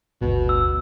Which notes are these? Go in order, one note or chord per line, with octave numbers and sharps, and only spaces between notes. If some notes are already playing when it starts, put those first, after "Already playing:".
G1 D2 B2
E6